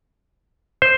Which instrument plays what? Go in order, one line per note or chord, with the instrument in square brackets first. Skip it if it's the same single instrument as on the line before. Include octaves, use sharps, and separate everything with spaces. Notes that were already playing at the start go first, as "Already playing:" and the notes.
[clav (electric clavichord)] C5